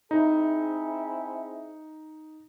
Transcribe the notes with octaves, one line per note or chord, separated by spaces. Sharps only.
C4 D#4 E4 G#4